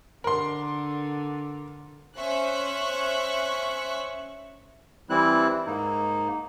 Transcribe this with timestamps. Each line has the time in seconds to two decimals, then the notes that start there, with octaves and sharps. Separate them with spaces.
0.24 D3 A#4 C6
2.16 C#4 C5 E5 C#6 F#6
5.10 E3 G3 C4 E4 F#6
5.66 G#2 A#3 D#4